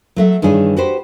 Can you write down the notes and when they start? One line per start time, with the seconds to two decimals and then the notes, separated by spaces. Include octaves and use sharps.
0.16 F#3 A3 E5
0.42 G2 D#3 E3 G#4 A4 C#5
0.77 F#4 G4 B4 C5